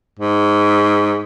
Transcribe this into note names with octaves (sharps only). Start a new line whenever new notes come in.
G#2